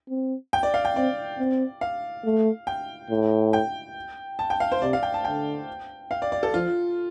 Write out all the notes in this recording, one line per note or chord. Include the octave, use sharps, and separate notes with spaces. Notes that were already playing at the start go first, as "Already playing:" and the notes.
C4
G5
D5
F5
G5
C4 D5
C4
F5
A3
G5
A2
G5
A5
G5
F5
C5
C3 D5
F5
G5
A5
D3 G5
F5
D5
D5
A4
F3 F4